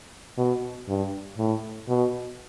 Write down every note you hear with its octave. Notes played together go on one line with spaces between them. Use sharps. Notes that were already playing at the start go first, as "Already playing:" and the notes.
B2
G2
A2
B2